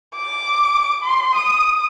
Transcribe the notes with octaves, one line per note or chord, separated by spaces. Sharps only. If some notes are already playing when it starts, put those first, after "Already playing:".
D6
C6
D#6